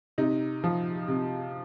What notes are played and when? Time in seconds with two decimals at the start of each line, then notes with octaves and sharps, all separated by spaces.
0.18 C3 D#4
0.64 F3
1.08 C3